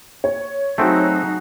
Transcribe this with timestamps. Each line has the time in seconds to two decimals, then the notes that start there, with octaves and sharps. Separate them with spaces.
0.24 C#5
0.78 F#3 A3 C4 D#4 F#4 G#4